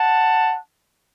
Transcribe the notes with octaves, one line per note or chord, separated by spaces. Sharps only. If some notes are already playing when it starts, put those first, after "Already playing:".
Already playing: F#5 A5